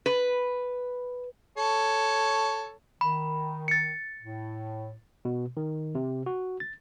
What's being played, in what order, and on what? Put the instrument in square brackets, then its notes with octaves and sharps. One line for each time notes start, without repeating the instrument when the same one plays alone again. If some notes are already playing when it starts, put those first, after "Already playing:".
[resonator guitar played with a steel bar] B4
[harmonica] A4 C#5
[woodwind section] D#3 [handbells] B5
[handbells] A6 C#7
[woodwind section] A2
[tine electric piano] B2
D#3
C3
F#4
A6